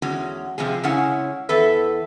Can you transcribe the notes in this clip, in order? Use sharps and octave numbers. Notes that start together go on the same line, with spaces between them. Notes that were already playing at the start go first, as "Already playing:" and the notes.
E2 D3 G#3 C#4 F#4
C3 F3 G#3 G#4
C#3 G#3 C#4 E4 F#5 G#5
E2 A4 B4 E5